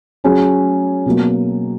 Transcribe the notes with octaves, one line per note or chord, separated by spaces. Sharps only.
F#3 C#4 G#4
B2 F#3 A#3